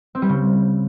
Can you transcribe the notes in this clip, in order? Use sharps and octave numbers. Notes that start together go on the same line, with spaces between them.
C4
G3
C#3